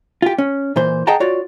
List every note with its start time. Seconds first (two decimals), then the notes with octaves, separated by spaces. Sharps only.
0.22 F4 G4
0.38 C#4
0.76 A#2 E3 C5
1.07 G#4 D#5 F#5 G5 A5 A#5
1.20 F4 F#4 C#5 D5